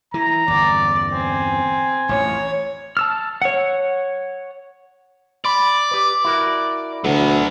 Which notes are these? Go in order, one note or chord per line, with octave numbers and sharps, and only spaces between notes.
E3 A#5
G1 E2 D5
C4 G#5
A1 F2 C#5
A5 E6 F6
C#5 F#5
D5 B5
G4 B4
E4 F#4 A#4
D2 F#3 B3